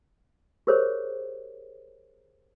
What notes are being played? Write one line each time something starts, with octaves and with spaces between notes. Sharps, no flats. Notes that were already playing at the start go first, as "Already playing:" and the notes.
G4 G#4 A#4 C5 C#5